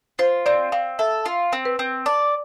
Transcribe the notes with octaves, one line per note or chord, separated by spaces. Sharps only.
F4 C5
C4 D5
C4 F5
A4 E5
F4
C4
B4
C4
D5 A5